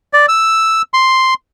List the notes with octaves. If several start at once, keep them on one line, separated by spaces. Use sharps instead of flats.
D5
E6
C6